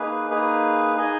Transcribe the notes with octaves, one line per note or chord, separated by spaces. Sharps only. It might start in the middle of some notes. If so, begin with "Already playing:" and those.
Already playing: A#3 D#4 G#4 B4
A#3 D#4 G#4 B4
D#4 G#4 D#5 G#5